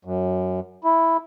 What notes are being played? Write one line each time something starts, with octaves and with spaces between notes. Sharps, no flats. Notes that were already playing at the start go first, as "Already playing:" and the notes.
F#2
E4